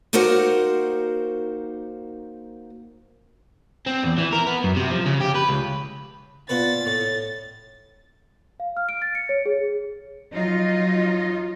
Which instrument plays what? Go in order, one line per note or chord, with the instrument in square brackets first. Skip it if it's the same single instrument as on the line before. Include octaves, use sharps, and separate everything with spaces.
[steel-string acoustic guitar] A#3 D#4 F#4 A#4 C5 F#5
[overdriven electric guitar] C4
E2
E3
A#4
B3
F#2
C3
F3
C#3
G4
B4
C#2
[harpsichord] A#2 B3 B4 [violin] A6
[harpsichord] A2
[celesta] F5
F6
D7
A6
C#7
C#5
G#4
[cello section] F3 F#3 D#4 F4 D#5